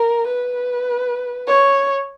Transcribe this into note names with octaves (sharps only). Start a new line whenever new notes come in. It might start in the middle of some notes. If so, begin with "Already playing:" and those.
Already playing: A#4
B4
C#5